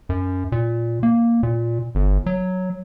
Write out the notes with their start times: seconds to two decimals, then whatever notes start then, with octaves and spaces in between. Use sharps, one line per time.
0.09 F#2
0.52 A#2
1.03 A#3
1.43 A#2
1.95 G1
2.26 F#3